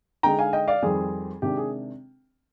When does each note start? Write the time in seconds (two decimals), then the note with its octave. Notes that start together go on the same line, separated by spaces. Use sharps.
0.23 D3 G#3 D#4 G5 A#5
0.39 F5 G#5
0.53 D#5 G5
0.68 D5 F5
0.83 F2 D#3 G3 C4 G#4
1.42 C3 D#3 G#3 D4 G4
1.57 G#4